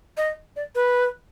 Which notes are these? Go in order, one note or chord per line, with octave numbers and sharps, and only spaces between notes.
D#5
D5
B4